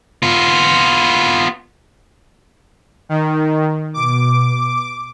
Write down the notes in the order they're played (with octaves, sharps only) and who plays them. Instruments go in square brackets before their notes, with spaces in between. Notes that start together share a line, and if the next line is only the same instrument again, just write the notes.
[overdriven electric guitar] B3 F4
[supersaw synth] D#3
[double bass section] B2 [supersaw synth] D6